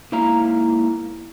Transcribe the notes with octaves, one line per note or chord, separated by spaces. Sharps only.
G#2 A#3 E4 F5 A#5